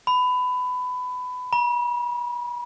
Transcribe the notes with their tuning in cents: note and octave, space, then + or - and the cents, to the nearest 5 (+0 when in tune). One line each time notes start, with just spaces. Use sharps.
B5 +20
B5 -40